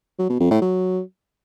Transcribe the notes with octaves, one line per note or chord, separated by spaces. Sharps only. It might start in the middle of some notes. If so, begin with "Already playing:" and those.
F#3
B2
F2
A2
F#3